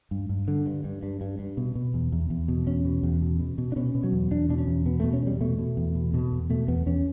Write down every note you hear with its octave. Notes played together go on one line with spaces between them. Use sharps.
G2
G2
D3
G2
G2
G2
G2
G2
B2
B2
E2
E2
E2
B2
E2 C#4
B2
E2
B2
B2
B2
D4
B2 C#4
B2
F#3
E2
E2 D4
B2 D4
C#4
E2
B2 B3
B2 A3
C#4
E2 G3
B2 A3
B2
E2
B2
B2
E2
B2 A3
E2 B3
E2 C#4